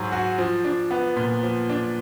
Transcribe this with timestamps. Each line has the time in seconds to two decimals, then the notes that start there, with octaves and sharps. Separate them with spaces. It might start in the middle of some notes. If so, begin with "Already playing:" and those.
Already playing: G#2 F#3
0.12 F#4
0.38 F3
0.65 D4
0.91 B3
1.17 A#2
1.43 F3
1.69 D4